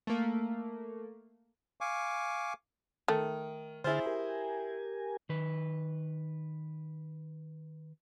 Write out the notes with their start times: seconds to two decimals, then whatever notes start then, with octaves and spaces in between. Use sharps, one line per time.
0.07 A3 A#3
1.81 F5 G#5 C#6 D6
3.08 D#3 A3
3.84 D3 E4 G#4 C5 F6 A6
4.06 G4 A#4 G#5
5.29 D#3 B4